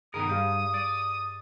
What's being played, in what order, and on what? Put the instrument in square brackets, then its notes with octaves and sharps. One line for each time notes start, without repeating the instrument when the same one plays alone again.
[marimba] G2 G#4 A#5 [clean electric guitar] B2 D#3 A#4 [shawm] D#6
[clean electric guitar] G2 [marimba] G4 F5 F6
[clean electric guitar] D5